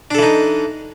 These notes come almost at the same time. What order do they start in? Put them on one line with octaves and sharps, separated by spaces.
D4 A4 E3 D#4